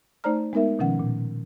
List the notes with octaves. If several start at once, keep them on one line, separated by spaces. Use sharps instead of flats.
A3 D#4 C5 D5 A#5 F6
G#3 B3 D#4 A#4 E5
B2 D#3 F3 C#4 F#5
A#2